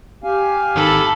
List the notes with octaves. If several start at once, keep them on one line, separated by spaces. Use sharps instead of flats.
G4 F5 G#5
G#1 D#3 A4 A5 B5